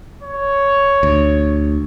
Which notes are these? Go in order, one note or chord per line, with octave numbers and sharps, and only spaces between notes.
C#5
D2